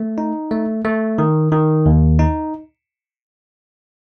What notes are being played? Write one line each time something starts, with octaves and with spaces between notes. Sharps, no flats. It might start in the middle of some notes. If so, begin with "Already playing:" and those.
Already playing: A3
D#4
A3
A3
D#3
D#3
D#2
D#4